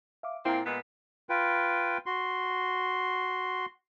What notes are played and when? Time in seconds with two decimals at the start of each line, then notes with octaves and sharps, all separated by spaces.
0.23 E5 F5 D6
0.46 A#2 A#3 C4 E4 A#5
0.66 A#2 G#3 B3 B6
1.29 F4 B4 G5
2.06 F#4 C6